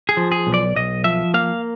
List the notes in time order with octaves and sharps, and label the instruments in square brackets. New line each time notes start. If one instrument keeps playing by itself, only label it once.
[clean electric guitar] G#4
F3
G#4
B1
D5
B1 D#5
F3 E5
A#3 F5